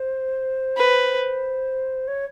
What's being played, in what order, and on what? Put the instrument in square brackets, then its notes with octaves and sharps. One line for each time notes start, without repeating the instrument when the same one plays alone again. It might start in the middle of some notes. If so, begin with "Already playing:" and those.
Already playing: [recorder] C5
[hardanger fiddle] B4
[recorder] C#5